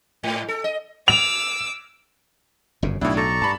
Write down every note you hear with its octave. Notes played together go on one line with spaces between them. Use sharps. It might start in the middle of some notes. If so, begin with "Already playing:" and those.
G#2
A4
D#5
D6 E6 F7
G1 F#2 C#3
B1 A2 D4 E4
A4 D5 A#5 C#6
G2 A5 B5